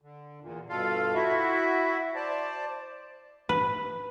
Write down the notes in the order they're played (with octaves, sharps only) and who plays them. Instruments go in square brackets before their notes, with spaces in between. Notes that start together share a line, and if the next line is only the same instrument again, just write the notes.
[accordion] D3
E2 A#2
G2 B2 F4 A4 F5
E4 F#4 E5
C5 D5 A5
[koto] B4